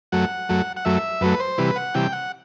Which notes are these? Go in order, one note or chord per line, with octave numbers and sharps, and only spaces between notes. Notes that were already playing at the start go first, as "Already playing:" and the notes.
F#2 F#3 A3 F#5
F#2 F#3 A3
F#5
F#2 F#3 A3 E5
F#2 F#3 A3 B4
C5
C3 E3 G3 B4
F#5
C3 E3 G3 G5
F#5